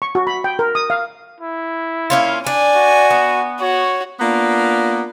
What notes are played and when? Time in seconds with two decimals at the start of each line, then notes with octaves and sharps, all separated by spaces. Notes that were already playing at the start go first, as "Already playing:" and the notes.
0.02 C#6
0.15 F#4
0.27 B5
0.44 G5
0.59 A#4
0.75 D#6
0.90 F5
1.40 E4
2.10 A#3 C#4 F4
2.47 D4 G#5
2.75 F#4
3.11 B3
3.60 F#4 C#5
4.20 A#3 B3 D4 F4